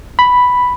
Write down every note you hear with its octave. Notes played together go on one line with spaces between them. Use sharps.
B5